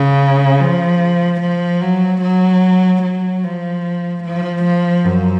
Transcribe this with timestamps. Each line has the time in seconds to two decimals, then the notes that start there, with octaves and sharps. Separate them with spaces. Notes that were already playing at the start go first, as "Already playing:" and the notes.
Already playing: C#3
0.60 F3
1.41 F3
1.82 F#3
2.22 F#3
3.03 F#3
3.44 F3
4.24 F3
4.64 F3
5.05 F#2